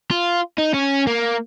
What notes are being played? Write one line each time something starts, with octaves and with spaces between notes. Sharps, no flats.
F4
D#4
C#4
A#3